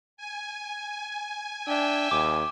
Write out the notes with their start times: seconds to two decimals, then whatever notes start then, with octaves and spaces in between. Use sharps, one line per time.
0.17 G#5
1.67 D4 E5 G5
2.11 D#2 D6